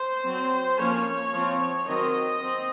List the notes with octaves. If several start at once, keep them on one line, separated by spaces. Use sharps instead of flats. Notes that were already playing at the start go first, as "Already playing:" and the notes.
Already playing: C5
F#3 C4
F3 A#3 C#4 C#5
F3 C4
D#3 F#3 C4 D#5
C4